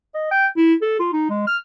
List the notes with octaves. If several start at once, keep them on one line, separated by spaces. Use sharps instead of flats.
D#5
G5
E4
A4
F4
D#4
G#3
F6